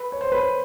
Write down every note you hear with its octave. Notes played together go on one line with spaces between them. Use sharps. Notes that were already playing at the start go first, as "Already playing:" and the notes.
Already playing: B4
C#5
C5
B4